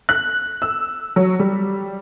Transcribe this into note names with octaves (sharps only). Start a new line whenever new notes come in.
F#6
E6
F#3
G3